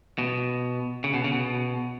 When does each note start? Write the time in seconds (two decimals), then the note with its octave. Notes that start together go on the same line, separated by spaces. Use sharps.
0.18 B2
1.04 C#3
1.14 B2
1.24 C#3
1.33 B2